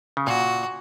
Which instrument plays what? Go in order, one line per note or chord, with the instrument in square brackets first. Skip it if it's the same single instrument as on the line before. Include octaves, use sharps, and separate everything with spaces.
[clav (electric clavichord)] C#3
[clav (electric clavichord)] A#2 [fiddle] F#4